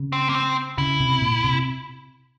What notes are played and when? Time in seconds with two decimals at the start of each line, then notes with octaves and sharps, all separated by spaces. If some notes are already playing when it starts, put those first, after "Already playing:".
Already playing: C#3
0.12 C4
0.29 A#3
0.35 C4
0.78 C#3 E4
1.00 C3
1.22 A#2
1.44 C3